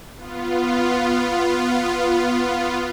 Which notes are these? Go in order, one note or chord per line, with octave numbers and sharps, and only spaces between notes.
B3 F4